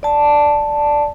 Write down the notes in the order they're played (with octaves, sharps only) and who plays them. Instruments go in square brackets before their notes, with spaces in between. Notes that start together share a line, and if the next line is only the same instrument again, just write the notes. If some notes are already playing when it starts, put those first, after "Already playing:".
[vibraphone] D5 A5